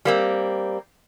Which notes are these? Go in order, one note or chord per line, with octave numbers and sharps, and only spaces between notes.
G3 A#3 C4